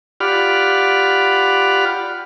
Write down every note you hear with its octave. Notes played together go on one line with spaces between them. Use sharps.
F4 G4 D5 F#5 B5 F6